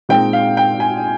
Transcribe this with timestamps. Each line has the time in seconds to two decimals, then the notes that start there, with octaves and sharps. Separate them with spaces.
0.09 A#2 G#3 C4 D#4 G5
0.33 F5
0.57 G5
0.80 G#5